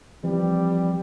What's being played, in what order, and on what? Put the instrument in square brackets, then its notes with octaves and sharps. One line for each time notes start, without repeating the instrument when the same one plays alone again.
[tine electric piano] E3 F3 C4 [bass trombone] G3